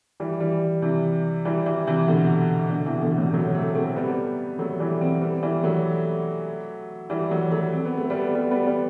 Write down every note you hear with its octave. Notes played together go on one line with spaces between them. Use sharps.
E3 G3
E3 G3
C3 E3
E3 G3
E3 G3
C3 E3
B2 D3
B2 D3
C3 E3
B2 D3
A2 C3
F#3 A3
A3 C4
A3 C4
G3 B3
F#3 A3
E3 G3
A3 C4
G3 B3
E3 G3
F#3 A3
E3 G3
F#3 A3
F#3 A3
C4
B3
A3
G3 B3
G3 B3
G3 B3
G3 B3